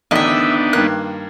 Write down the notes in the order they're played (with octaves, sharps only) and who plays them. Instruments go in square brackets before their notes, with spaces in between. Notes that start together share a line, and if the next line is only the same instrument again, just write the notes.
[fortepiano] A1 D3 D#3 [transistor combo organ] B3 D4 D#4 [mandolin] D#5 E5
[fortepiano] G2 D#3 A#3 [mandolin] F#6